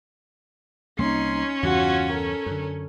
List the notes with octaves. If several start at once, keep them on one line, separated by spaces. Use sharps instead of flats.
C2 A#3 C#4 D#4 C6
E2 G2 C#3 F4 F#4
A4 A#4
F#2 D3